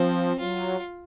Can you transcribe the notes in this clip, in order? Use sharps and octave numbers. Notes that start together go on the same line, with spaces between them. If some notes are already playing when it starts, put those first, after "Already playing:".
Already playing: F3 C4
F#3 F4